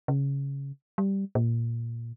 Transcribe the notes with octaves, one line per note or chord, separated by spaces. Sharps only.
C#3
G3
A#2